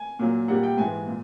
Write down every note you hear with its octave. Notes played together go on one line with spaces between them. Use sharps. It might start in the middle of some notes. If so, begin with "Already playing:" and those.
Already playing: G#5
A#2 F#3 A#3
A#2 G3 A#3 F#5
G5
G#2 E3 G#3 G#5
A#2